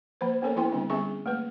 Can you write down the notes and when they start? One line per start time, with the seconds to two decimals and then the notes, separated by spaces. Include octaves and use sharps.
0.21 F3 A#3 B4 C5
0.42 A#3 B3 C#4 A4 A#4 C#5
0.56 F3 B3 E4 G5 C6
0.72 D3 G3 B3 C4 D4
0.90 G3 B3 C#4 G#4 E5 C#6
1.26 A3 A#3 B4